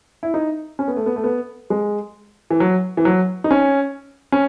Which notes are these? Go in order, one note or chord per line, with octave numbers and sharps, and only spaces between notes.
E4
D#4
C#4
B3
A3
B3
A3
B3
G#3
E3
F#3
E3
F#3
D#4
C#4
C#4